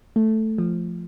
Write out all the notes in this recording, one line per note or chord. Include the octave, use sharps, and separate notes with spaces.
A3
F3